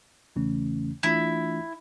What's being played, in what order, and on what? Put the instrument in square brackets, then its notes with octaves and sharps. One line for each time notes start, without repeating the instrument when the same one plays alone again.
[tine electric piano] E2 C#3 E3 A3 C#4
[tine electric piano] E3 A3 D4 F4 [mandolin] E4